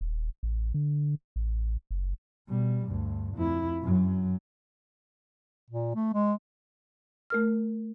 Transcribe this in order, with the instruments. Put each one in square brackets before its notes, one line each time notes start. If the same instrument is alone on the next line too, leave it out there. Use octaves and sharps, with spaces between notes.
[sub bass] D#1
A1
D3
A1
F#1
[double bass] B2 G3
D2 G2
F2 E4
F#2 F#3
[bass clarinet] A#2
A3
G#3
[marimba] A3 A#4 F6